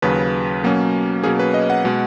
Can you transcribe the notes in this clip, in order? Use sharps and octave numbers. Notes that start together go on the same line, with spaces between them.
D#2 C#3 F#3 B4
B2 F#3 A#3 C#4
B2 F#3 A#3 C#4 G#4
B4
D#5
F#5
B2 G#3